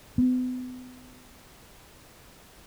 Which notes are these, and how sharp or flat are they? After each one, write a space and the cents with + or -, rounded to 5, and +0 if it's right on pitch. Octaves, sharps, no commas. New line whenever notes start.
B3 +40